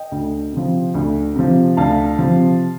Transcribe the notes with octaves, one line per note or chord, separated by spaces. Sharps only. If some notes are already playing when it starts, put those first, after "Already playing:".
Already playing: D#5 G5
D2
C3 F3
D2
C3 F3
D2 F5 A5
C3 F3